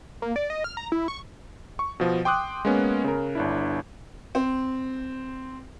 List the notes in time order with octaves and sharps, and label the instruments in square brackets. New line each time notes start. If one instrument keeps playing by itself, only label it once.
[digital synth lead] A#3
D5
D#5
F6
A#5
E4
C#6
[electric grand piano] C#6
B2 F3
G5 C6 D6 D#6 F#6
G#3 A#3 B3 C#4
C#3 A#4
G1 D4 E4
[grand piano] C4